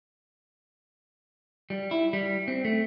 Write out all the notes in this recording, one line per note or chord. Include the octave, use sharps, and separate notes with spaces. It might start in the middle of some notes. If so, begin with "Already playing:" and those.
G3
E4
G3
C4
A3